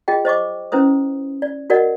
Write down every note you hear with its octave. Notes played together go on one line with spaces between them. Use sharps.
F4 G#4 D#5 G5
C5 D#5 C#6 D6
C#4 E4 B4 C5 D#6
D5
F#4 A#4 D5 D#5 F#5